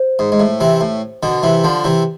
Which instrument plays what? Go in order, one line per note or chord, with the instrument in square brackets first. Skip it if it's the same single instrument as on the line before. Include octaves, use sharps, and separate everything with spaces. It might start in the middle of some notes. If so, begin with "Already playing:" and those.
Already playing: [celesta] C5
[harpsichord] G#2
G#2
A2
C3 E3
A2
B2 D3
C3 E3
D3 F3
C3 E3